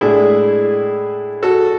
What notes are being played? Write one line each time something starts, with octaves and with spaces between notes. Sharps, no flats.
A2 G#3 D4 E4 G#4
F#4 A4